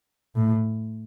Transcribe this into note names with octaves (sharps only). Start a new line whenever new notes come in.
A2